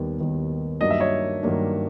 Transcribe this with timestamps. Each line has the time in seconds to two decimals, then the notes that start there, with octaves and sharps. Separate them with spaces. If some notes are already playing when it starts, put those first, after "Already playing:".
Already playing: D#2 D#3 G3 B3
0.18 D#2 D#3 G3 B3
0.81 G2 D#3 F#3 A#3 D4 D#5
0.91 E5
1.00 C#5 D#5
1.43 G2 D#3 F#3 A#3 D4